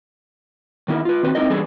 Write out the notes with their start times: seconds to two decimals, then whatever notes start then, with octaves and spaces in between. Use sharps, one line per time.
0.88 D#3 B3 E4 A#4
1.05 F4 B4
1.23 D#3 C4 F#4 B4
1.35 C4 D#4 E4 A#4 D#5
1.50 E3 G3 B3 D4 G#4 A4